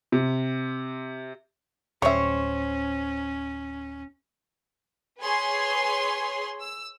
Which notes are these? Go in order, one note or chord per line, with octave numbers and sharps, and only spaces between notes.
C3
D1 G3 C#4 C5 C#5 E5
G#4 B4 C#5 G#5 C6 C7
E6